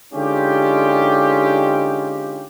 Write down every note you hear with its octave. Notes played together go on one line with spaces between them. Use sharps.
D3 G#3 C#4 D#4 F4 G4